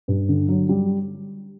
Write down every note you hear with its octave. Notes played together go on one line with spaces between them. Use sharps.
G2
D3
F#3
G3